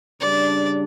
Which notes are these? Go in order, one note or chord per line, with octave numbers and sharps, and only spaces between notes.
C#3 G3 D4 D5